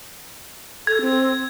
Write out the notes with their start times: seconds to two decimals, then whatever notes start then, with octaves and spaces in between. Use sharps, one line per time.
0.87 A4 G#6
1.02 C4